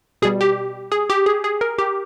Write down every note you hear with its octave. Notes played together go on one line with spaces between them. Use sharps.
B2 G3 G#4
G4
G#4
G4
G#4
G#4
A#4
G4